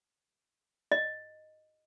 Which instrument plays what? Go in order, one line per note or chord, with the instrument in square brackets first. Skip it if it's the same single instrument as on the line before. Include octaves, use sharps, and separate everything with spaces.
[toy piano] D#5